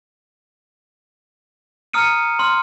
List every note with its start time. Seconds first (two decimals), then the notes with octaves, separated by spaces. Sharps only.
1.93 A#5 D#6 F6 C#7 D#7
2.39 C6 F6